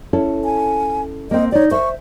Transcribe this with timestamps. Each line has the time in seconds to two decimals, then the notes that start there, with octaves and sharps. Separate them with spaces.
0.13 C#4 E4 A4
0.44 G#5
1.31 A#3 C4 D#5
1.52 D#4 C#5 D5
1.71 C5 E5 C#6